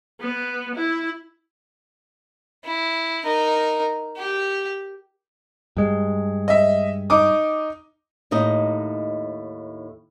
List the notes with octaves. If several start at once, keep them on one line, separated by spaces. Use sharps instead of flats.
B3
E4
E4
D#4 A#4
G4
G2 G#3
D#5 E5
D#4 D6 D#6
D#2 A2 D#4 D#5